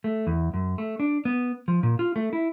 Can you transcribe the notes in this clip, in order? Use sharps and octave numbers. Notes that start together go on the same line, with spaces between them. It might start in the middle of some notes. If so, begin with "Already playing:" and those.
A3
E2
F#2
A3
D4
B3
F3
A#2
F4
A3
E4